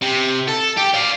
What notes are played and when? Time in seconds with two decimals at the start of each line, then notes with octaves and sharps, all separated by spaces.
0.01 C3
0.48 A4
0.77 G4
0.94 D5 F5